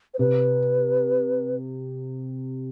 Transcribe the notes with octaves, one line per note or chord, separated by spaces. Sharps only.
C5
C3 B4